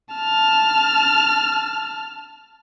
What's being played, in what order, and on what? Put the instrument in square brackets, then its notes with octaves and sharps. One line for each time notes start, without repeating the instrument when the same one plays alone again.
[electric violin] A5 F6